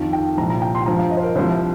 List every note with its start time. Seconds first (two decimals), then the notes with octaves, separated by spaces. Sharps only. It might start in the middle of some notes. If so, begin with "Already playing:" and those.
Already playing: F2 D#3 F4
0.13 G5
0.37 C2 A#2 F3 A#5
0.50 A#5
0.62 G5
0.75 C6
0.82 G5
0.86 G2 F3 A#5
0.99 F5
1.11 D#5
1.17 C5
1.23 A#4
1.35 C2 C3 F3 C5